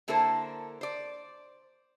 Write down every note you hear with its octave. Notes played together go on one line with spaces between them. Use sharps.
D3 A#3 E4 A4 A#4 C5
C5 D5